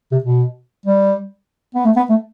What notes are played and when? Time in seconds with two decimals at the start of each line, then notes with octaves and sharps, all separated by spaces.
0.12 C3
0.24 B2
0.86 G3
1.75 B3
1.85 A3
1.96 B3
2.09 A3